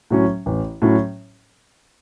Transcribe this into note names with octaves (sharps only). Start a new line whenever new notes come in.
A2 F#3 C#4
A1
A2 F#3 C#4